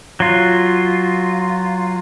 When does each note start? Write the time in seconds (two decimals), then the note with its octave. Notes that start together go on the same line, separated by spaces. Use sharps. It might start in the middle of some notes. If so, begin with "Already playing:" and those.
0.20 F#3 F4